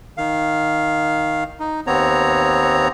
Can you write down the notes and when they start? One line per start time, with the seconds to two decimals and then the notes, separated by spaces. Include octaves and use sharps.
0.18 D#3 F5
1.60 D#4
1.87 D#2 B3 C4 C#5 A#5